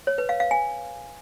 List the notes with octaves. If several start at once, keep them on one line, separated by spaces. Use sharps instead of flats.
C#5
B4
F5
F5
G#5